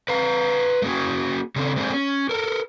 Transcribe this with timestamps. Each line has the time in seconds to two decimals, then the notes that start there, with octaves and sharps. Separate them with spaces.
0.08 B4 F5 A#5
0.82 A3 A#3 C#4 F#4 G#4
1.56 C#3 C4 D4 A4
1.76 G#3 A#3 C4 D4 D#4 G#4
1.93 C#4
2.29 A4 A#4